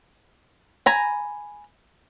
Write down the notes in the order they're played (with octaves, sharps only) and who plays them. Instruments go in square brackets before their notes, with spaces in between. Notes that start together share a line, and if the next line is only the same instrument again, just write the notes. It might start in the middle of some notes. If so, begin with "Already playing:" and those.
[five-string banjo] G#5 A#5 B5